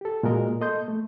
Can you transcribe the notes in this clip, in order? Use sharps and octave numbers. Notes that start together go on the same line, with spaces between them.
G4 A4
A#2 G#3 F#4 A#4 D#5
A#3 A4 D#5 C6 G6
A3